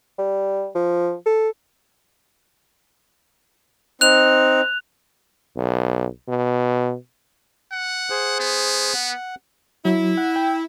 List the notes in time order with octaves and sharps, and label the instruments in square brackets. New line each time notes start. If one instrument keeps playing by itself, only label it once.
[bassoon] G3
F3
A4
[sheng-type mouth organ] C4 D#4 [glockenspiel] F#6 F7
[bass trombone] B1
B2
[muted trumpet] F#5
[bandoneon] G#4 C5
[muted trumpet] B3
[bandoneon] F#5
[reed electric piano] F#3 [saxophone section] E4
[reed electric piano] F#5
G5